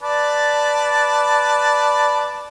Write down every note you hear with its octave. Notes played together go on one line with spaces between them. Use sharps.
B4 D5 A5